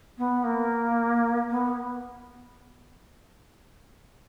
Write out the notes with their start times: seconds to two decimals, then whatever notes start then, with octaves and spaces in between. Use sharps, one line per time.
0.17 B3
0.44 A#3
1.50 B3